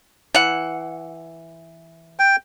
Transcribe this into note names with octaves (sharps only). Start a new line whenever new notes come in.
E3 F#5
G5